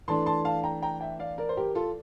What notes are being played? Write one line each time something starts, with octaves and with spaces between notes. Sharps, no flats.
E3 A3 D4 A5 C6
A5 C6
F5 A5
G5 A#5
G5 A#5
E5 G5
D5 F5
A#4 D5
C5
G4 A#4
F4 A4